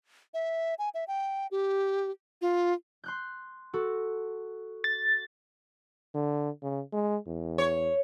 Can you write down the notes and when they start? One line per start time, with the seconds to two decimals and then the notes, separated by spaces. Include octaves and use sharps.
0.34 E5
0.79 G#5
0.94 E5
1.08 G5
1.51 G4
2.41 F4
3.04 C6 F#6 G6
3.73 F#4 A4
4.84 A6
6.14 D3
6.63 C#3
6.93 G#3
7.27 E2
7.58 C#5